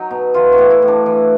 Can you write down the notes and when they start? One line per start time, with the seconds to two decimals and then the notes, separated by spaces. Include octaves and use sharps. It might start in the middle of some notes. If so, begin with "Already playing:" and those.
Already playing: F#3 D#4
0.11 B2
0.34 E3 F4
0.52 F#4
0.58 A2
0.70 E4
0.82 A2
0.88 D4
1.06 E3